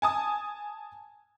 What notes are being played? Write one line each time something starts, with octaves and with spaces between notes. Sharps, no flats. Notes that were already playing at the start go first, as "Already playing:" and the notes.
G#5 A5 D#6